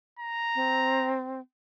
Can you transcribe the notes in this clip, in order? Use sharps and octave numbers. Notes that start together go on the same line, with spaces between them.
A#5
C4